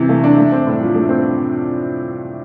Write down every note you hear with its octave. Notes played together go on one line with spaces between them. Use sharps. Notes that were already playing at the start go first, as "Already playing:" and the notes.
Already playing: C3 E3
A3
D4
A3
C4
A2
F3
A3
C4